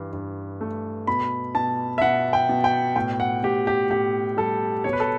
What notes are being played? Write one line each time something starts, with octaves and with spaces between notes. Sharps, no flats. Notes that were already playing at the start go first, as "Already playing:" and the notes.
Already playing: G2 E3
G2
A3
B2 B5
B2 A5
E5
B2 F#5
G5
B2
G5
A2 G5
F#5
A2 G4
G4
A2 G4
G3 A4
B2 C#5
B4
A4